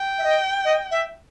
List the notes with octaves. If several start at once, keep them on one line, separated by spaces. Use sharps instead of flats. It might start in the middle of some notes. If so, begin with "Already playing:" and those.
Already playing: G5
E5
D#5
D#5
E5